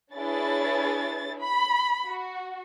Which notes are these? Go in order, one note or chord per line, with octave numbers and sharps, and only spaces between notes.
D4 E4 G#4 B4 C#5 A6
B5
F#4